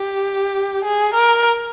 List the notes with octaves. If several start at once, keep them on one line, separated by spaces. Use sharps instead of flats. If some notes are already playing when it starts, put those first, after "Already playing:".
Already playing: G4
G#4
A#4